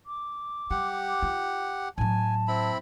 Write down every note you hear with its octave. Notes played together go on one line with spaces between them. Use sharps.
D6
G3 G4 F#5
F4
A2 F#3 G#5 A5
C4 E4 B5